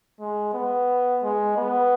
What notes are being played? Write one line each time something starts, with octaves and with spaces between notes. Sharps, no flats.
G#3
B3
G#3
B3